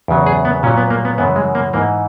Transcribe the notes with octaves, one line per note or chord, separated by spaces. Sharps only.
E2 C#3 F#3
G#4
B3
A#2 F#3 C#4
B3
A#3
B3
F#2 C#3 E3 B3
G#3
A#3
G#2 E3 A#3